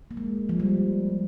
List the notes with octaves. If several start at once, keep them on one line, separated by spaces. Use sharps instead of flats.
A#3
G#3
F3
G3